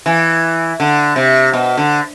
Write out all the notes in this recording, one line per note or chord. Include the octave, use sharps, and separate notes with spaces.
E3
D3
C3
B2
D3